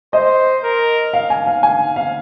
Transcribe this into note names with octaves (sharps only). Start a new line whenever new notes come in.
C5 D#5
A#4
F5
G#5
F5
G#5
F5